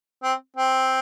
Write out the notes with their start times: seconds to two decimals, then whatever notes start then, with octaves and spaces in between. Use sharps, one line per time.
0.23 C4
0.57 C4